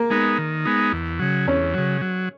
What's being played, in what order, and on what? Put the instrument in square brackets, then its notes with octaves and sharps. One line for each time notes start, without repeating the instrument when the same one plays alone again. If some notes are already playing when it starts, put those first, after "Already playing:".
Already playing: [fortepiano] A#3
[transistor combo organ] G#3 B3 D#4
D#3
G#3 B3 D#4
E2
C#3 F#3
[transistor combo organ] E2 [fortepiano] C#4
[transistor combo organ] C#3 F#3
F#3